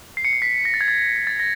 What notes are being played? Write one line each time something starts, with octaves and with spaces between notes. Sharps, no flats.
C7
C#7
C7
B6
A#6
A6
G#6
A6
A6
A#6